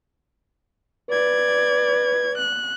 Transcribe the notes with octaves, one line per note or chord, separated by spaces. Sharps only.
B4 D5 G#6
F#6